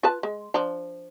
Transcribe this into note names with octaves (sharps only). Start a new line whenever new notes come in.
F4 B4 A5
G#3
F3 D4 A#5